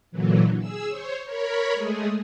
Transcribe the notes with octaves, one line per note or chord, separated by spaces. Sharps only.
A#2 D3 E3 F#3
G#4 E6
C5 C#5
A#4 C#5 B5
G#3 A3 G#4